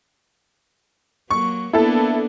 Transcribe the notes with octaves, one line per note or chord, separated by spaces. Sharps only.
F#3 A#3 C#6
A#3 B3 D4 E4 A4